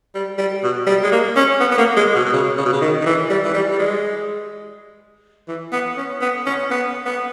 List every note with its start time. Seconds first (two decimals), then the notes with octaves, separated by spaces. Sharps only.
0.15 G3
0.38 G3
0.63 B2
0.87 G3
1.04 G#3
1.12 A#3
1.36 C#4
1.60 B3
1.72 B3
1.78 A#3
1.97 G#3
2.15 B2
2.26 B2
2.33 C#3
2.58 C#3
2.65 B2
2.72 C#3
2.82 D#3
3.01 D#3
3.06 E3
3.30 G3
3.45 E3
3.54 G3
3.72 G3
3.79 G#3
5.48 E3
5.73 B3
5.97 C#4
6.21 B3
6.46 C#4
6.71 B3
7.06 B3